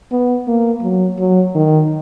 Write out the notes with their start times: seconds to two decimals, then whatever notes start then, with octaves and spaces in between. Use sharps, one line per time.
0.12 B3
0.47 A#3
0.82 F#3
1.18 F#3
1.55 D#3